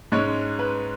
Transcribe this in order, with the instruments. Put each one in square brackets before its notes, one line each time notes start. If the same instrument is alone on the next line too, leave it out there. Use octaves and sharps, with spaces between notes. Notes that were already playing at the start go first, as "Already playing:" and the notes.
[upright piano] G#2 G#3 C#4 C#5
B4